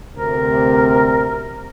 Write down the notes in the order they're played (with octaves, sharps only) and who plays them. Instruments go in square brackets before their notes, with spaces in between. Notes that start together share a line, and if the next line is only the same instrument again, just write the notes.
[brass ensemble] D2 C3 [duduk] A#4